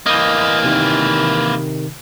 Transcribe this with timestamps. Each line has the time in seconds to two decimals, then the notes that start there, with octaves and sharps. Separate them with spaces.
0.06 E3 A#3 D#5 D#6 G6
0.64 C3 D#3